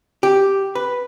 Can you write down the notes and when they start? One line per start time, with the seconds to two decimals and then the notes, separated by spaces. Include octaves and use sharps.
0.23 G4
0.75 B4